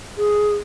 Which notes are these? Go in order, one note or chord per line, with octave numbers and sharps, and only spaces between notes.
G#4